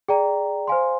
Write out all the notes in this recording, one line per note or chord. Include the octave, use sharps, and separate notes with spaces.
G#4 D5 G5 A#5
C5 F5 G#5 C6